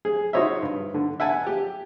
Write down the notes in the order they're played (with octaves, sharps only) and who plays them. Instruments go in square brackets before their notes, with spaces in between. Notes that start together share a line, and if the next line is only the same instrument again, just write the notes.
[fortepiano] G#4
D#4 F#4 C5 C#5 D#5 E5
G2
D3
E5 F#5 G#5 A5
G4